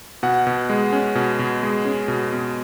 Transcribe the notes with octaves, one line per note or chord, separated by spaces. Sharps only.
B2 F#5
B2
G#3
C#4
B2
B2
G#3
C#4
B2
B2